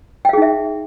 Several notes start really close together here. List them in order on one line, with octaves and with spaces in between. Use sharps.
G5 F5 G#4 D#4 E5